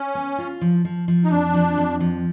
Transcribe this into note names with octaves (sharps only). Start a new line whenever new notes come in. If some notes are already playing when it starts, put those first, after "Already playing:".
Already playing: C#4
B3
F4
F3
F3
F3
D#4
F2 D4
F3
F2
F3